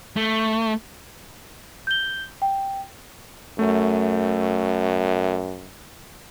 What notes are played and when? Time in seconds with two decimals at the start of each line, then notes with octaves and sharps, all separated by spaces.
0.16 A3
1.87 G6 G7
2.42 G5
3.59 F#2 A3